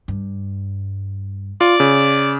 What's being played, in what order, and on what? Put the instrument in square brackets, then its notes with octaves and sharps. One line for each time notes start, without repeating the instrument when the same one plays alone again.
[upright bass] G2
[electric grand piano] F4 [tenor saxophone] D5
[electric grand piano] C#3